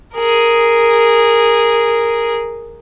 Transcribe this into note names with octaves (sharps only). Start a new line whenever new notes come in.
G#4 A#4